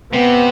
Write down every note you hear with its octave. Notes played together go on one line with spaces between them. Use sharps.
C3 B3